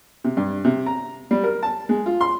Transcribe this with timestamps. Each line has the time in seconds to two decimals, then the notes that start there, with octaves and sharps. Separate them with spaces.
0.24 C3
0.37 G2
0.65 C3
0.86 A#5
1.31 G3
1.44 A#4
1.63 A5
1.89 G#3
2.06 F4
2.21 C6